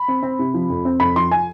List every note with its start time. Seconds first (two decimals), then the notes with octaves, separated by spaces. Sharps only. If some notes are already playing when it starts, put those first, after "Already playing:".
Already playing: B5
0.08 C4
0.23 C4
0.39 C3
0.54 F3
0.69 F2
0.85 C4
1.00 F2 B5
1.16 F3 C6
1.31 G#5